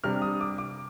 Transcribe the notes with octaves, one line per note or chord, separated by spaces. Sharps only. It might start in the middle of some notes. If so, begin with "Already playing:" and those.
C3 G3 D4 F6
D#6
D6
D6